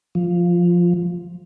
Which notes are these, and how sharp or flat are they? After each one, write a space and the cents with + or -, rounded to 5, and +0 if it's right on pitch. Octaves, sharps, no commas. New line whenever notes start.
F3 +0